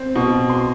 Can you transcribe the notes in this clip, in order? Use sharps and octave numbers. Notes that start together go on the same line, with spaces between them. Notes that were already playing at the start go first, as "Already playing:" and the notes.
Already playing: C4
B2
C6